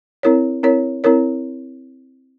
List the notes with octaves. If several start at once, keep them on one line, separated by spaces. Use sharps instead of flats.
C4 E4 A#4 C#5
C4 E4 A#4 C#5
C4 E4 A#4 C#5